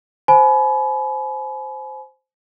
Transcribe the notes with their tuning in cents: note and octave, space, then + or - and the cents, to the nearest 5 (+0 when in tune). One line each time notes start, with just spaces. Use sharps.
C5 +0 G#5 +40 B5 +0